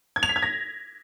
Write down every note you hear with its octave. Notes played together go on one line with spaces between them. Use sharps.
G#6
F7
B6
G#6
A#6